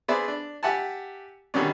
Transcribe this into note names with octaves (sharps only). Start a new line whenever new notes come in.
B3 G#4 C5 D5 E5
D4
G4 E5 F#5 G#5 A5
B2 D3 D#3 G3 C#4 D4